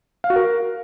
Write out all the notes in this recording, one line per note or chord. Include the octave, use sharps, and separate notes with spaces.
F5
F#4
A#4